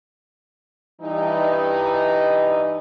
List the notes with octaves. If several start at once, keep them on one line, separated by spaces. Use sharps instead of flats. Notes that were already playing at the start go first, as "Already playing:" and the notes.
G2 E3 D#4